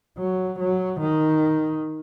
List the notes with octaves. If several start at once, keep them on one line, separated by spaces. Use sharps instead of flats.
F#3
F#3
D#3